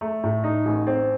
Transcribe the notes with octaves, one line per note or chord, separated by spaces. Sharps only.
A3
A2
D#4
A1
C4